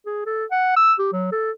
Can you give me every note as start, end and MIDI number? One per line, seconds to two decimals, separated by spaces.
0.06 0.21 68
0.26 0.45 69
0.51 0.74 78
0.77 0.94 88
0.99 1.13 67
1.13 1.28 54
1.32 1.51 69